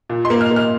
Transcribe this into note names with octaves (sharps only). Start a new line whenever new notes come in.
A#2
C6
A#3
F6
A#3
F6